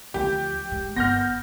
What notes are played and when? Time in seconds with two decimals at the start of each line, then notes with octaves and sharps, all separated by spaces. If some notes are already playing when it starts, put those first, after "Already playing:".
0.14 D2 F3 G4
0.71 G#2
0.96 G1 B3 F6 G6 A#6